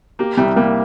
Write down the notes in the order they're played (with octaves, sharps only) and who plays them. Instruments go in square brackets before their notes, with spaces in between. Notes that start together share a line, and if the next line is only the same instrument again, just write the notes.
[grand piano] A#3 [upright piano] G4
[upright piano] C2 [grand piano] G3
[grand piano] G3 [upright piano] A#3